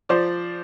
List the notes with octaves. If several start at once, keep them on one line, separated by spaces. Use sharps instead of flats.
F3 C5 D5